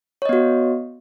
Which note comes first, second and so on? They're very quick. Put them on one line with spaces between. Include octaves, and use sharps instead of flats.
C#5 D#5 B3 F#4